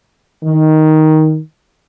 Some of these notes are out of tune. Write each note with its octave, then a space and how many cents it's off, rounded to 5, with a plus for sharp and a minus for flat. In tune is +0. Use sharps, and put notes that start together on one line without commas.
D#3 +5